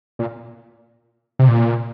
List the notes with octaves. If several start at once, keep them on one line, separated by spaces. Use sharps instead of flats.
A#2
C3
A#2